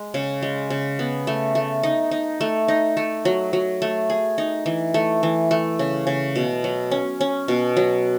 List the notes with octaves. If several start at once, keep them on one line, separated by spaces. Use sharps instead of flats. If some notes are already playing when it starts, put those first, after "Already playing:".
Already playing: G#3
C#3
G#3
C#3
B3
A3
A3
D#4
D#4
A3
D#4
A3
F#3
F#3
A3
G#4
D#4
E3
A3
E3
A3
C#3
C#3
B2
F#3
C#4
C#4
B2
F#3